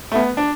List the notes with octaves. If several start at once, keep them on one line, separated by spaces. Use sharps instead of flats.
A3
B3
D4